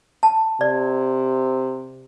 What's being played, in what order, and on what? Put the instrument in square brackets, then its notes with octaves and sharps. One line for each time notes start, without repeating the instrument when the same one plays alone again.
[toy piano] A5
[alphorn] C3 [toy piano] D5